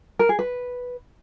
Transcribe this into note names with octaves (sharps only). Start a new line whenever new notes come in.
A#4
G#4
B4